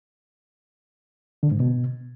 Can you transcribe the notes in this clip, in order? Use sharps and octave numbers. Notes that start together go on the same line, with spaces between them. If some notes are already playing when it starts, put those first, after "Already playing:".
D3
G#2
B2